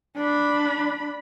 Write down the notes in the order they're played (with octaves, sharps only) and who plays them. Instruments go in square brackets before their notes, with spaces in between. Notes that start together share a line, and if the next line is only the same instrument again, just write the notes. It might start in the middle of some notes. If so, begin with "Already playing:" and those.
[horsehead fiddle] D4 B5